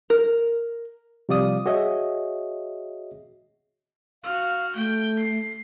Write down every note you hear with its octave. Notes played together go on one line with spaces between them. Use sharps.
A#4
C3 F3 G3 D5 F5 D#6
F#4 G#4 C#5 D#5 E5
F#4 F5 F6
A3 G5
C7